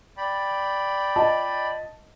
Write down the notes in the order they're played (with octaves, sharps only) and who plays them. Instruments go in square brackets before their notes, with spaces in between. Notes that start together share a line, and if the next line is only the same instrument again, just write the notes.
[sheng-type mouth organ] D5 G5 B5
[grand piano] F4 D#5 A5